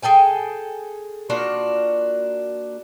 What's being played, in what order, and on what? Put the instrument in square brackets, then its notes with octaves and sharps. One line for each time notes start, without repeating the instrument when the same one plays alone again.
[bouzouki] G#4 A4 G5 G#5
A#3 D4 F4 F#4